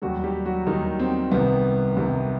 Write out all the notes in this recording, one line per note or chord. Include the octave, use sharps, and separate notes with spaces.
D#2 D#3 F#3 G3 F#4
G3 G4
F#3 F#4
D#2 D#3 G3 D#4
C4
C2 C3 D#3 B3
C2 C3 D#3